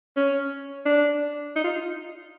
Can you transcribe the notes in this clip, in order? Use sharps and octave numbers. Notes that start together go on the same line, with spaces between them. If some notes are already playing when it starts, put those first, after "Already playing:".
C#4
D4
D#4
F4